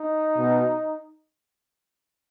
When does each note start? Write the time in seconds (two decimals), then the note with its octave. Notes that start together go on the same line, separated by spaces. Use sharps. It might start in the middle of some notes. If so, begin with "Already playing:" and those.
Already playing: D#4
0.37 B2